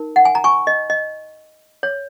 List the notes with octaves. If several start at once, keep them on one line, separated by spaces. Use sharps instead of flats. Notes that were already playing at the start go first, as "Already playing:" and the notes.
Already playing: D#4 A#4
F#5
G#5
A#5
G#5 C#6
D#5
D#5
C#5